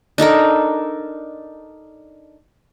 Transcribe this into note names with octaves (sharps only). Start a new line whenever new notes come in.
D4 D#4 A4 A#4